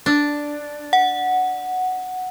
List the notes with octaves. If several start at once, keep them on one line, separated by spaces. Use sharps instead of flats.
D4
F#5